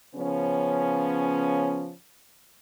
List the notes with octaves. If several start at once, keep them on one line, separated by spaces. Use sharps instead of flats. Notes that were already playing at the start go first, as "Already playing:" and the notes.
C#3 F3 B3 C#4